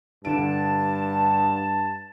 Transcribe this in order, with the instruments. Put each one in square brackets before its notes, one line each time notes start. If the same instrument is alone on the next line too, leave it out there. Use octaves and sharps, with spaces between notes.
[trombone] G2 [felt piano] D3 D7 [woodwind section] A5